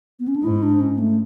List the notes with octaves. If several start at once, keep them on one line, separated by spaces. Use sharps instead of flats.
B3
C#4
D4
G#2 E4
D4
C#4
A3